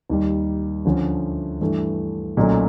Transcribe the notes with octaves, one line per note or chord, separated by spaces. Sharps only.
D#2 D#3 G3
D2 D3 F3 A3 C#4
G2 E3 A3
B1 A#2 F#3 A3 C#4